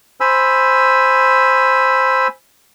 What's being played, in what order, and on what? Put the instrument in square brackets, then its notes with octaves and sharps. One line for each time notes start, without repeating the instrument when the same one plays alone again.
[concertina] C5 G#5 B5 E6